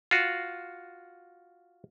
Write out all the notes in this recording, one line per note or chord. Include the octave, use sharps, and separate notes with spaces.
F4 F#4